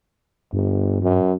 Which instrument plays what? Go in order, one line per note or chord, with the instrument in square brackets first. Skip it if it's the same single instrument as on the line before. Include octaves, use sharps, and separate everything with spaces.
[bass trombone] G1 [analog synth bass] G2
[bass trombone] F#2